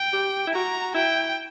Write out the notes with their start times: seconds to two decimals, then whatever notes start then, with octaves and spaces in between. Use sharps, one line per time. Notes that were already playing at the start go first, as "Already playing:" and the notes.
Already playing: G5
0.13 G4
0.47 E4
0.54 F#4 A#5
0.95 E4 G5